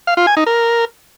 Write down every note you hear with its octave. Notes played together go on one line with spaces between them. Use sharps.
F5
F4
G#5
D#4
A#4